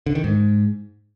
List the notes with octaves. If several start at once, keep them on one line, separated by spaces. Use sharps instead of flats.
D3
D#3
G#2